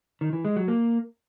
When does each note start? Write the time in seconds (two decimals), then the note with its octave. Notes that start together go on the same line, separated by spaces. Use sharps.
0.21 D#3
0.33 E3
0.45 G#3
0.56 F#3
0.68 A#3